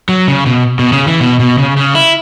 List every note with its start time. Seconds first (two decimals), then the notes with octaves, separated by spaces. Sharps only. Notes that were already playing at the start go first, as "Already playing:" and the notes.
0.09 F#3
0.28 C#3
0.46 B2
0.79 B2
0.92 C#3
1.06 E3
1.21 B2
1.40 B2
1.58 C#3
1.77 C#3
1.95 E4